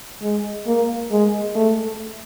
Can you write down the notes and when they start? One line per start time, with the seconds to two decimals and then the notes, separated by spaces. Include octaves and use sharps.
0.22 G#3
0.67 A#3
1.11 G#3
1.55 A3